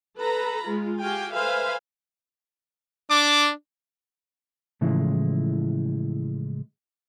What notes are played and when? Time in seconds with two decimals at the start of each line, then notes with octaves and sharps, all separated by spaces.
0.18 A4 B4 A#5 B5
0.66 G#3 F4
0.99 F#4 G4 F5 G5 G#5
1.33 A4 B4 C5 E5 F5 G#5
3.10 D4 D6
4.81 A2 C#3 E3 F3 G#3 E4